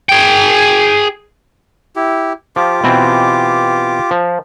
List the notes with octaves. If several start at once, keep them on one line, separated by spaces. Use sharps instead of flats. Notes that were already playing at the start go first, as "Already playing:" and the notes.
G#4 G5
E4 G4
F3 F4 G4 D6
B2 E3 C4
F3